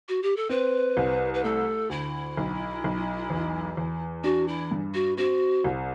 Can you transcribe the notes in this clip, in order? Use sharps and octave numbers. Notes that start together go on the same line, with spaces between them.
F#4
G4
A4
C4 B4
C2
B4
A3 A4
D2 E4
B1
B1
E2
E2
D4 F#4
E4
G2
F#4
C4 F#4
C2